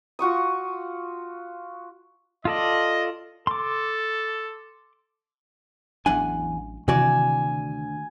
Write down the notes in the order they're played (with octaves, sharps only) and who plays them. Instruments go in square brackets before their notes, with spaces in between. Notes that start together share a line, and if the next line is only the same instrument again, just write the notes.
[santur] F4 F#4 C#6 D#6
[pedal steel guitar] F4 A4 D5 [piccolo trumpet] D#5
[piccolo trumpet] A4 [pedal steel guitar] C6 D6
[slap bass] A1 F#3 D4 [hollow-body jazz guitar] E2 F#5 G#5
[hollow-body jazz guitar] D2 F#4 D5 [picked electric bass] C3 E3 [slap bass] D#3 [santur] G#5 E6